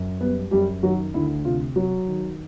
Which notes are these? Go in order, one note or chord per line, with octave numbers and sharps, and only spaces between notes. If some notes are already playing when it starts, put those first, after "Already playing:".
Already playing: F#2
G3 B3 B4
F#2 G3 G4
D#3 F#3 F#4
D2 E4
C3 F4
F#3 F#4
D#3